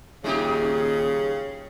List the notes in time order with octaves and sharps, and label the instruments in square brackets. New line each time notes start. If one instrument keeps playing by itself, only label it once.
[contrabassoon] D#1 [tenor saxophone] C#3 [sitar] G#3 D#4 G4